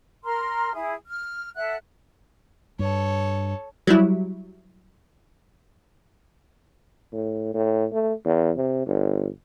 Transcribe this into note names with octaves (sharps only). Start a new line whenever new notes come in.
A#4 A#5 C6 F6
E4 G#4
F6
A4 E5 F#5 F#6
G2 A4 C#5
F#3 G3 E4
A2
A2
A3
E2
C3
G1